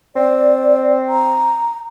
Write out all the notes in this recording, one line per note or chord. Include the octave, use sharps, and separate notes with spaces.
C4 D5
A#5